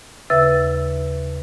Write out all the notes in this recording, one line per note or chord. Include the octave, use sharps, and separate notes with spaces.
D#2 C#3 B4 E5 E6 A6